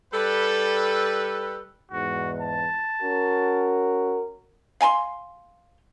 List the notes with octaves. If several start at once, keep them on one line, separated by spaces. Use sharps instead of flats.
G3 A4 B4
E2 G#2 F#4
A5
C#4 F#4 A#4
F5 G#5 A#5 C6